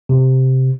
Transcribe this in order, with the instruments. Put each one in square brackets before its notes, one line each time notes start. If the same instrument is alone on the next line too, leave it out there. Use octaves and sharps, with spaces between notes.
[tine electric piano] C3